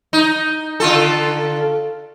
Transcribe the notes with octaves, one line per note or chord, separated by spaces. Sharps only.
D#4
D3 F4 A4